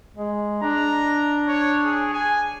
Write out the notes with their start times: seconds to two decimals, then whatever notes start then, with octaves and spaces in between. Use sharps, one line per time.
0.17 G#3
0.63 D4 A#5
1.48 C#5
1.84 G#4
2.13 G#5